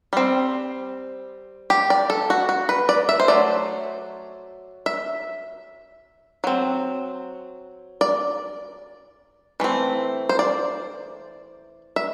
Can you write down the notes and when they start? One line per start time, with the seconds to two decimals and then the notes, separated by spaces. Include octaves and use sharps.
0.13 G3 C4
1.70 G4
1.90 D5
2.10 A4
2.30 F#4
2.49 F#4
2.69 B4
2.89 D5
3.09 E5
3.20 C5
3.28 F#3 A3 D5
4.86 E5
6.44 F#3 C4
8.01 D5
9.60 E3 A3 C4
10.29 C5
10.39 D5
11.96 E5